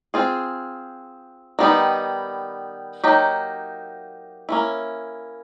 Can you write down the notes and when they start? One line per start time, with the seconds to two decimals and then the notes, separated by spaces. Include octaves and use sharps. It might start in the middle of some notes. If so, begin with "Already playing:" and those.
0.14 C4 F4 G#4
1.59 D#3 G3 B3 D#4
3.04 F#3 A#3 D#4 G4
4.49 A#3 C#4 E4